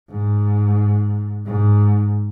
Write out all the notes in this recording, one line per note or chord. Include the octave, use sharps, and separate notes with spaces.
G#2
G#2